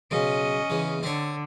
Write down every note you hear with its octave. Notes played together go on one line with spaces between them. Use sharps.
B1 C#3 C#4 D#5
E2 C#3
D3 C4 C#5